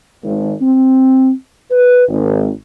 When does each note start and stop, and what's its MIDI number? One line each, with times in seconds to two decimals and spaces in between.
0.24 0.52 32
0.61 1.30 60
1.71 2.04 71
2.08 2.48 32